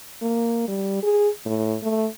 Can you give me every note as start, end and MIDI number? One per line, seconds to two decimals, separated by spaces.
0.22 0.63 58
0.68 0.99 55
1.03 1.29 68
1.46 1.77 45
1.83 2.07 57